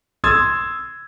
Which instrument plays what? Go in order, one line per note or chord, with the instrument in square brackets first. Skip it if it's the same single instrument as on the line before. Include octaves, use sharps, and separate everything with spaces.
[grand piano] C6 D#6 E6 G#6 A6